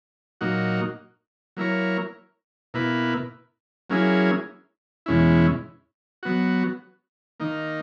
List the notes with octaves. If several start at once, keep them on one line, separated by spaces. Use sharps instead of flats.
A#2 F#3 A#3 D#4 F#4
F#3 A#3 E4 A#4 C#5
B2 A#3 E4 B4
F#3 A#3 C#4 E4 G#4
E2 B2 G#3 C#4 E4
F#3 B3 F#4
D#3 A#3 D#4